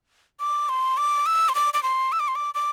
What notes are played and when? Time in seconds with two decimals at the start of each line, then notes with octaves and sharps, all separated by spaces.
0.40 D6
0.69 C6
0.97 D6
1.26 E6
1.49 C6
1.55 D6
1.74 D6
1.83 C6
2.12 E6
2.20 D6
2.28 C6
2.35 D6
2.55 D6